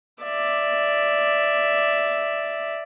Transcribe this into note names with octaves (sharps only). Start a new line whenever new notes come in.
D5 E5